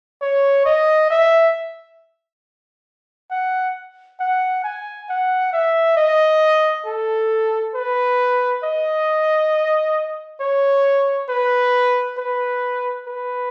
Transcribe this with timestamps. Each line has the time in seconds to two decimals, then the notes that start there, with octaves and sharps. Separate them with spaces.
0.22 C#5
0.66 D#5
1.11 E5
3.31 F#5
4.20 F#5
4.64 G#5
5.09 F#5
5.53 E5
5.97 D#5
6.86 A4
7.74 B4
8.64 D#5
10.40 C#5
11.29 B4
12.18 B4
13.06 B4